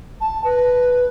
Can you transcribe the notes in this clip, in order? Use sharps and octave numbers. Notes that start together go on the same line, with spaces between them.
A5
B4